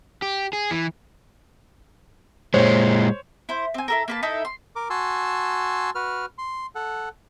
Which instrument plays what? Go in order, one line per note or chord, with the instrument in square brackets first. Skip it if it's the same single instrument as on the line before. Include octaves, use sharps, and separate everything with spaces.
[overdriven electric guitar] G4
G#4
E3
[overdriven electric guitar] A#2 G#3 [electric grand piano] C5 C#5
[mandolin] E4 C5
C4 G#5
E4 A4 A#4
A#3 B4 A5
D#4 E4 A4 E5
C6
[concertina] A#4 D6
F#4 G#5 A5 C6 E6
F#4 B4 F6
C6
A4 F#5